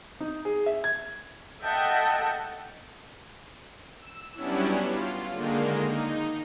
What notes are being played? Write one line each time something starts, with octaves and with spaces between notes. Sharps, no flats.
D#4
G#4
E5
G#6
A4 D#5 E5 F#5 G5 A5
E6
F#3 G3 B3 C#4 D4 E4
F4
D3 D#3 G#3 A#3
D#4